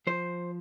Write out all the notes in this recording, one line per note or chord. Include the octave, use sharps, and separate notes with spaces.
F3 C5